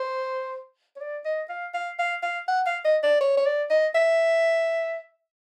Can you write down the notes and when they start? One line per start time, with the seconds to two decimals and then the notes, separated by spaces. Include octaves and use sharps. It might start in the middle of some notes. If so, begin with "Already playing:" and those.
Already playing: C5
0.96 C#5
1.01 D5
1.25 D#5
1.49 F5
1.74 F5
1.99 F5
2.23 F5
2.48 F#5
2.66 F5
2.85 D#5
3.03 D5
3.21 C#5
3.37 C#5
3.46 D5
3.70 D#5
3.94 E5